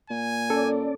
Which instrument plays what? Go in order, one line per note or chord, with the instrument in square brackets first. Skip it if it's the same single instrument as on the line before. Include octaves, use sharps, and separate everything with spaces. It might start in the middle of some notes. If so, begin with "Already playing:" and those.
[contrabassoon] A#2 [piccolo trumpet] G#5
[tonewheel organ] C#4 D5 [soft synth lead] A4